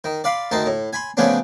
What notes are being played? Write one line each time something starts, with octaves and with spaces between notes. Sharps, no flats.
D#3
D5 F5 B5 C6
D2 D#3 D#4 A5 C6
A2
G#5 B5 C6
C#3 F3 A3 B3 C#4 D4